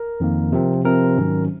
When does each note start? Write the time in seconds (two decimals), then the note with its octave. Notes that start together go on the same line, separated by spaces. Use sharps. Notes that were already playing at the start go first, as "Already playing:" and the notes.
Already playing: A#4
0.20 F2 D#3 A#3
0.52 C3 F3 C4
0.85 C3 F3 C4 A#4
1.17 G#2 D#3 F#3 C#4